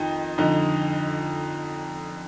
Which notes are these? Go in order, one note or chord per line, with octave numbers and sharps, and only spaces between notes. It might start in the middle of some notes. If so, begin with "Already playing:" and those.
Already playing: F2 D#3 D#4
F2 D3 D#4